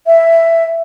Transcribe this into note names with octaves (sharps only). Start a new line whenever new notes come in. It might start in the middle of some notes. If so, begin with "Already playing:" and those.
E5